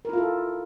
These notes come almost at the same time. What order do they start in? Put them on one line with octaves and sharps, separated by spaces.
A#4 E4 F4 A4